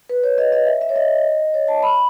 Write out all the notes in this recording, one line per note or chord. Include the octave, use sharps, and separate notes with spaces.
B4
C#5
D#5
D#5
E5
E5
C#5
D#5
C#5
A5
B5